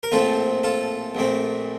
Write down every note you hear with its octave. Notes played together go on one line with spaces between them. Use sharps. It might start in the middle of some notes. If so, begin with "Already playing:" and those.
A#4
A#1 A2 F3 C4 F4 A4
F4 A4
A#1 A#2 A3 C4